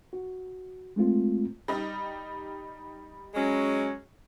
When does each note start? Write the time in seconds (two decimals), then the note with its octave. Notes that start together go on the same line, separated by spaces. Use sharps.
0.13 F#4
0.96 G#3 A3 C4 F4
1.68 G3 D#4
3.34 F#3 G#3 C#4